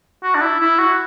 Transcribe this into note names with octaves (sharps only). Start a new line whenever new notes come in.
F#4
D4
E4
E4
F#4